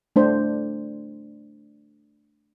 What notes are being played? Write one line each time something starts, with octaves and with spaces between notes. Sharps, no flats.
A3 D4 C5